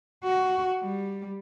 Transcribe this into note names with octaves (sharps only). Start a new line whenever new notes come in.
F#4
G3